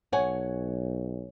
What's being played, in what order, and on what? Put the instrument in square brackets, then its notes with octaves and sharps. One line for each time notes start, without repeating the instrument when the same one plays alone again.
[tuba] B1 [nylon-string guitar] C#5 F#5 G#5